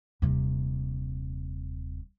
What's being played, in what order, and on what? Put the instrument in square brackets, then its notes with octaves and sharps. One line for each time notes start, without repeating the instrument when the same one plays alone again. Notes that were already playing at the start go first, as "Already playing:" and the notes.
[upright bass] D#1 C3